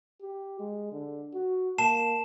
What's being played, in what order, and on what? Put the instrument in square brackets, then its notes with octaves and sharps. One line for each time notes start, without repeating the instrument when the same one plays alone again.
[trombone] G4
G#3
D3
F#4
[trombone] A#3 [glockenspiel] A5 C7 E7